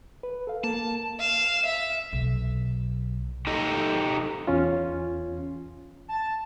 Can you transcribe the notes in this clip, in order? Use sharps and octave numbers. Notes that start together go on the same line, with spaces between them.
B4
A4 F5
A#3 A5
F5 E7
E5
B1
D#4 G4 A4 D#5
E2 C#4 F4
A5